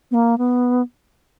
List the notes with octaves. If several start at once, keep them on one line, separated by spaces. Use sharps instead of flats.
B3
A#3
B3